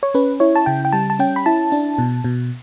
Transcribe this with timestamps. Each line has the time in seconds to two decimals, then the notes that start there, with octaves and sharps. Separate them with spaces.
0.03 C#5
0.14 C#4 B4
0.40 E4 C#5
0.55 A5
0.66 C#3 G5
0.85 G5
0.92 G3 A5
1.10 A5
1.19 C#4 G5
1.36 B5
1.46 E4 A5
1.72 D4
1.98 B2
2.24 B2